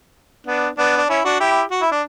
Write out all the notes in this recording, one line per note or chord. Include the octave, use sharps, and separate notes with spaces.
B3 D4
B3 D4
D4
C#4 E4
D4 F#4
E4 G4
F#4
E4
D4